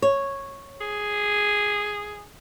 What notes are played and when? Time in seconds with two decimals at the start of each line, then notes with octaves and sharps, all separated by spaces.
0.02 C#5
0.81 G#4